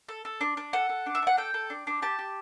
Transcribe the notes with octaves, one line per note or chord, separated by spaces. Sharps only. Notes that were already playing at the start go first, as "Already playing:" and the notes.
A4
A4
D4
D4
A4 F#5
A4
D4
E5
D4 F#5
A4 G5
A4
D4
D4
G4 A5
G4